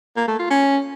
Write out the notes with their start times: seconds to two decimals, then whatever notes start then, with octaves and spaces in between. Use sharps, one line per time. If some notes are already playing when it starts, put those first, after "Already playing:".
0.16 A#3
0.28 A3
0.39 F4
0.50 C#4